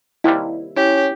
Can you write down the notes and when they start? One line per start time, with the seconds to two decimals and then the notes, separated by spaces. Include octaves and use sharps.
0.24 D#2 C3 G3 E4
0.76 C#4 E4 G4